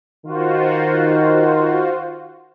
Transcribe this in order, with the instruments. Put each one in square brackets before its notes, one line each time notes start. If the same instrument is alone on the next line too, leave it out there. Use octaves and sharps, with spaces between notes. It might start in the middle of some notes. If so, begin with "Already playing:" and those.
[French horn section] D#3 [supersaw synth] F4 F#4 C5